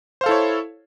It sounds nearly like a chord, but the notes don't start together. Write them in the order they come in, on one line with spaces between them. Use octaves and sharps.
C5 F5 A4 E4 C#5